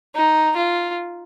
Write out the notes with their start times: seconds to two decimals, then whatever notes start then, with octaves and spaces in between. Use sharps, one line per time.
0.15 D#4
0.56 F4